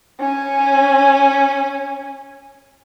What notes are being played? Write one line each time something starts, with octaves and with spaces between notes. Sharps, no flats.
C#4 G#5